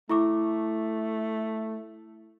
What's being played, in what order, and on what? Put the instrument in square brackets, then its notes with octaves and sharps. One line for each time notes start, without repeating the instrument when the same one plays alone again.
[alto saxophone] A3 [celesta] E4 C#6 D6